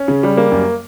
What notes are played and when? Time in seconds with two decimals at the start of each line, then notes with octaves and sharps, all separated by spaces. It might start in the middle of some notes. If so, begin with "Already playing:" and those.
Already playing: C#4
0.08 C#3
0.23 G3
0.37 A#3
0.52 F#2